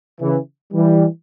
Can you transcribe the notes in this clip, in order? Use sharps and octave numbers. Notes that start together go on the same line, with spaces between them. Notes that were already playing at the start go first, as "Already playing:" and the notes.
C#3 E3
E3 G3